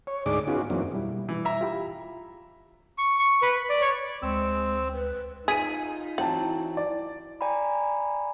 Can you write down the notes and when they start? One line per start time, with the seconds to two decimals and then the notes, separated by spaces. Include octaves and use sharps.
0.07 C#5
0.26 D2 G#2 D#4 G#4 D5 D6
0.47 B3 C#4 D#4 F4 F#4 G#4
0.70 F#2 E3 F#3 A#3 C4 D4
0.91 B2 G3 E4
1.29 E3
1.45 E5 A#5
1.61 F4 G4 B5
2.98 C#6
3.19 C#6
3.42 B4
3.56 B5
3.70 D5
3.81 C#5
4.22 D2 G#3 C4 E6
4.94 B4
5.48 D#4 F4 G#4 B6 D#7
6.18 E3 F#3 C4 F#5 G5 A5
6.77 D5
7.41 D5 G5 G#5 A#5 B5